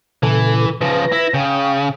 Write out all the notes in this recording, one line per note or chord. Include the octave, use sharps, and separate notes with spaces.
A#2 C#3 E3 A4
C#3 F3 B4 A#6
E4
C#3 G5 D#6